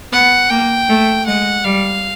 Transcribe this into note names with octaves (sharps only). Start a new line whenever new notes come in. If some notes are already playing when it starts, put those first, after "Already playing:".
B3 F#5
A#3 G5
A3
G#3 F#5
G3 F5